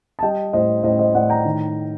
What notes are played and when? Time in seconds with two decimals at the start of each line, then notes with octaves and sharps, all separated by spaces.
0.19 A5
0.22 G3 D#5 G5
0.53 A2 C5 D#5
0.83 A2 C5 D#5
0.99 C5 D#5
1.14 A2 D5 F#5
1.30 G5 A#5
1.45 D#3